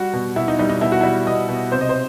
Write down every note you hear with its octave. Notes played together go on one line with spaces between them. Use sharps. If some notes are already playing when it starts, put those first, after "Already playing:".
Already playing: G3 F#4
B2
B2 E4
D#4
G3 D#4
D#4
B2 E4
F#4
G3 E4
B2 D#5
B2
C3 C5
D#5
C5